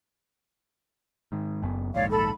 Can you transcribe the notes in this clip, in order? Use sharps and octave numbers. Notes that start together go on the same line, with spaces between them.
G#2 D#3
F#1 F#2 B3
A#1 D#2 G#2 C#5 D5 F5
A4 B5